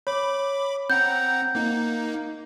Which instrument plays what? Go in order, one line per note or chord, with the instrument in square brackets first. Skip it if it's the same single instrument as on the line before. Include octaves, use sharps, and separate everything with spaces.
[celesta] C#5 [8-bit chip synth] B5 D6
[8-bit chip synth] C4 F#5 A#5 [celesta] G6
[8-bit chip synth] A#3 D#4